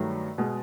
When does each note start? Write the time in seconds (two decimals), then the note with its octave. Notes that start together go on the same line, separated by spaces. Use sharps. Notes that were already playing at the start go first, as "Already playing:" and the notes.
Already playing: G2 D#3 F#3 A3
0.38 B2 G#3